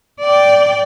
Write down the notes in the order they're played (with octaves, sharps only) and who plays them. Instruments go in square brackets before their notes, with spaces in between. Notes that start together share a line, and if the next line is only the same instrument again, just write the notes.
[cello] D5 G5